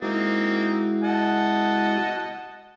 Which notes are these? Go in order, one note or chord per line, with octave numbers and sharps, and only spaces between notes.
G#3 A#3 C4 D#4 E4 F#4
D#5 F#5 A5